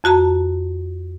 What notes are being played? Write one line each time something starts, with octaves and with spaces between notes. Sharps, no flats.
F2 F#4 A5 A#5